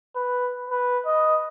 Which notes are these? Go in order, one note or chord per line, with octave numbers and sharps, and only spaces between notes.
B4
B4
D#5